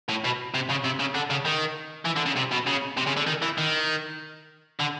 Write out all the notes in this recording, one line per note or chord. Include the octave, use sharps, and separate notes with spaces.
A2
B2
C3
C#3
C3
C#3
D3
C#3
D#3
E3
D3
C#3
C3
B2
C#3
C3
C#3
D3
D#3
E3
D#3
D3